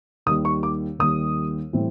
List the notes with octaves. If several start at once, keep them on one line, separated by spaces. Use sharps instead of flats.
D#2 D#3 G3 D#6
C#6
D6
D#2 D#3 G3 D#6
A2 E3 G3 C4